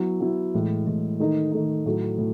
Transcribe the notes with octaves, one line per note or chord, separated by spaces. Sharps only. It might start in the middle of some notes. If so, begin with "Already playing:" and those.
Already playing: F#3 B3 E4
F#3 B3 E4
A2 E3 G#3
A2 E3 G#3
D#3 A3 D#4
D#3 A3 D#4
A2 F#3 A3
A2